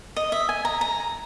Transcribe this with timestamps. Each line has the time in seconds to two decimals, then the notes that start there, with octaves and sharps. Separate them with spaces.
0.16 D#5
0.32 E5
0.49 G#5
0.65 A#5
0.81 A#5